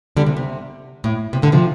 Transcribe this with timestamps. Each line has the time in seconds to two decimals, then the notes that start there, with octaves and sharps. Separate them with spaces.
0.17 D3 G3
0.27 C3
0.37 C3
1.04 A2
1.33 C3
1.42 A2 D3
1.52 C3 F3